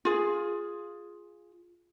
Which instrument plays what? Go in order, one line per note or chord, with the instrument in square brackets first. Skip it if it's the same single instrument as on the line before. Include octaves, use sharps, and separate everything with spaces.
[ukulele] F4 G#4